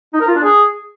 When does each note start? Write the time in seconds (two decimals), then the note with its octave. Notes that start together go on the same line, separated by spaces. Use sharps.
0.13 D#4
0.21 A#4
0.28 F4
0.35 D4
0.43 G#4